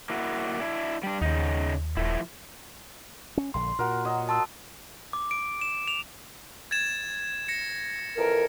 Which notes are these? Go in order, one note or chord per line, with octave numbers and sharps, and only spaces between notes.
A#3 E4 F#4
D4 E4
G3 D4
D#2 C#3 D#4
D#1 F3 A3 E4
C#4
A#1 D3 C6
A#2 F#4 A#4
F#3 D#5
A5 C6 E6
D6
D7
E7
F7
G#6 A6 E7
A#6 C#7
F2 E3 A#4